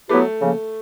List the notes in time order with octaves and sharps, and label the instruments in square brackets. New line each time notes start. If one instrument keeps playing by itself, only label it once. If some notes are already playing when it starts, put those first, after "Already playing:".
[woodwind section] F#3 B3 E4 G4 B4 [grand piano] A3
[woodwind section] C#3 F3 A#3